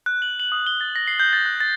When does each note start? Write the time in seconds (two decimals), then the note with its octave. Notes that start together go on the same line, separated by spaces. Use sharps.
0.06 F#6
0.22 F#7
0.40 F#7
0.52 D#6
0.67 G7
0.81 A6
0.96 A#6
1.07 C7
1.20 G6
1.33 A6
1.46 F#6
1.60 A6